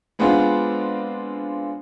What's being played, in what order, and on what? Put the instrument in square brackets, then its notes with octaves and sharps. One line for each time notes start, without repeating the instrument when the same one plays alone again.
[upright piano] G#3 B3 C4 D4 F4